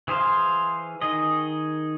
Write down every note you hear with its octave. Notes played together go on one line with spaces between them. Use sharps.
E3 G#4 C5 F5
D#3 G#4 D#5